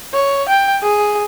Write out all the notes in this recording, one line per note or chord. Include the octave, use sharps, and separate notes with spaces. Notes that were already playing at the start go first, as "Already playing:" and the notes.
C#5
G5
G#4